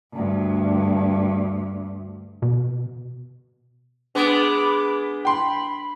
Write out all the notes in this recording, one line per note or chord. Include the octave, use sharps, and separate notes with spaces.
D2 G2
B2
G#3 B3 D4 D6
G5 B5 C6